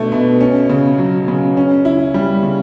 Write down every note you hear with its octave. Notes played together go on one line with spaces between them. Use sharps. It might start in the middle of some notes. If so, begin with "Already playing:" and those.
Already playing: B2 A3 D4
B2
C#4
C#3
F#3
C#3
C#4
E4
G3
C#3